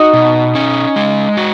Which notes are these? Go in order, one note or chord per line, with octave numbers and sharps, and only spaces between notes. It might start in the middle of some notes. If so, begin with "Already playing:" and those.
Already playing: D#4 F#4
B2
C#4
G#3
F#4